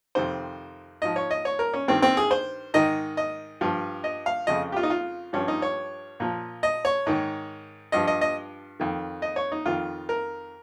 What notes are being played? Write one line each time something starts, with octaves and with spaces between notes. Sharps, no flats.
F2 C3 D#3 C5
G#2 F3 D#5
C#5
D#5
C#5
A#4
C#4
G2 D#3 C4
C4
G#4
C5
G#2 D#3 D#5
D#5
G2 F3
D#5
F5
F2 C#3 F3 D#5
G4
F4
D#4
F4
G2 F3 C#4
D#4
C#5
A#2 F3
D#5
C#5
G#2 D#3
G2 F3 D#5
D#5
D#5
F2 D#3
D#5
C#5
D#4
F2 D#3 F4
A#4